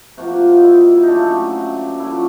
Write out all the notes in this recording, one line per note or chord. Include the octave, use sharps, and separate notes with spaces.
C3 F3 A#3 F#4
D#4
E4
D#4
C#3 F#3 A3 D4
A#2 F#3 A3 E4